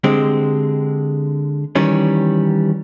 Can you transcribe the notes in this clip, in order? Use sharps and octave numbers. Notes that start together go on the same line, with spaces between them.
D3 G#3 C4 G4
D#3 E3 G3 C#4